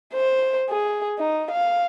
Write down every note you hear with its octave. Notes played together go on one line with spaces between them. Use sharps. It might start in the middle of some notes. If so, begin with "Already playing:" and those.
C5
G#4
D#4
F5